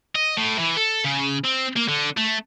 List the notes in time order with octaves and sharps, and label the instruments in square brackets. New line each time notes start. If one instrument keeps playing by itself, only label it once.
[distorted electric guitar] D#5
A2
E3
A4
C#3
C4
A#3
D3
A3